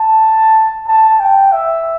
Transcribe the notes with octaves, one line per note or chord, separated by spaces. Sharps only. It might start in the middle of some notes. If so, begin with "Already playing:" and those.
Already playing: A5
A5
G5
E5